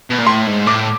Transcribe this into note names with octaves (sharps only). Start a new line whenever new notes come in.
B2
A#2
A2 C6
G#2
A2 D6